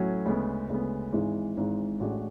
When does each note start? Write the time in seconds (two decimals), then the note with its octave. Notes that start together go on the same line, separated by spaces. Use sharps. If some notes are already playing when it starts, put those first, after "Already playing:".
Already playing: A2 F#3 A3 C#4 F#4
0.25 D2 C#3 G#3 B3
0.69 D2 C#3 G#3 B3
1.13 G#1 G#2 E3 G#3
1.57 G#1 G#2 E3 G#3
2.00 A1 A2 G#3 D4 F#4